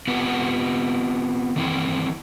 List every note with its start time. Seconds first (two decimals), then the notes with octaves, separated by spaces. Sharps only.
0.08 B3 C4 F4 G4 B4 F#5
1.56 D#3 E3 C4 E4